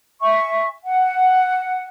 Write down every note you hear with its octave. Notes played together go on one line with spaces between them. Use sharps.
E5 G#5 C#6
F#5